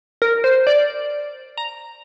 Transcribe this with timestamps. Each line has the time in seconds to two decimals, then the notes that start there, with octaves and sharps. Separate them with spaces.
0.22 A#4
0.44 C5
0.67 D5
1.58 A#5